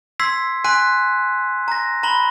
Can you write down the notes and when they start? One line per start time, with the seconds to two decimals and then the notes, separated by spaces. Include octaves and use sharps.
0.20 C6 E6 G#6 B6 C7
0.64 G#5 C6 F#6 B6 D#7
1.68 A#5 A#6
2.03 A#5 B5 F#7 G7